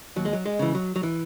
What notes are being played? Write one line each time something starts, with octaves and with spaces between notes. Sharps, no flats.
D#2 F#3
G#3
F#3
G#3
C#3 E3
F#3
F#3
E3